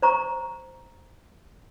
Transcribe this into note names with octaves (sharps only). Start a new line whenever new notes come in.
C5 A#5 C#6